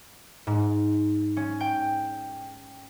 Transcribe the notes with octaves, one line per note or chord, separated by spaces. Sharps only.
G#2
C#4
G5